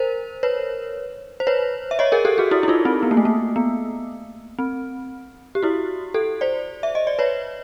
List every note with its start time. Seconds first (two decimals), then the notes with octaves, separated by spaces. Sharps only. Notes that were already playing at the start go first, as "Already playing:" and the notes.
Already playing: A#4 C5
0.43 B4 C#5
1.40 C5
1.47 B4 C#5
1.91 E5
1.99 C#5 D#5
2.12 G#4 A#4
2.25 G4 A4
2.38 F#4 G#4
2.51 E4 F#4
2.63 E4
2.68 D#4 F4
2.85 C4
3.03 B3
3.11 A#3
3.17 A3
3.25 A#3
3.56 B3
4.59 C4
5.55 G4
5.63 E4 F#4
6.14 G4 A4
6.41 C5 D5
6.83 E5
6.95 D#5
7.07 D5
7.19 B4 C#5